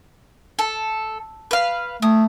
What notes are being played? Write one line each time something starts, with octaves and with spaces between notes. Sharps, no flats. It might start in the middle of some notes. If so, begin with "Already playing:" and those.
A4
B4 F5
A3 D#6